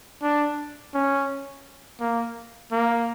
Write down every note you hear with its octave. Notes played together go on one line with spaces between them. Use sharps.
D4
C#4
A#3
A#3